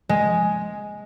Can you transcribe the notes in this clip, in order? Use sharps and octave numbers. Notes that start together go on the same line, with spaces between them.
G#3